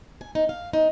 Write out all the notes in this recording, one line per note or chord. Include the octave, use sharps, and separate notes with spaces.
G#5
D#4
F5
D#4